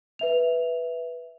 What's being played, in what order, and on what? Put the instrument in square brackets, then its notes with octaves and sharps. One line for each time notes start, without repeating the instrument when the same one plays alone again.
[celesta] B4 E5 F7